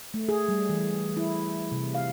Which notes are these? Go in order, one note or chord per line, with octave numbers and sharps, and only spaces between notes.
A3
G#4
G3
E3
E4
C3
F5